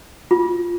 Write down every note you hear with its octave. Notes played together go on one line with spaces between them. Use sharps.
F4